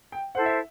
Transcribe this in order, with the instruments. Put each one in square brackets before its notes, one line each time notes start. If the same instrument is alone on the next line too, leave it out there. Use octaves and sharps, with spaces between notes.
[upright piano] G5
[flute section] E4 A4 C5 [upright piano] F#5
[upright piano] E5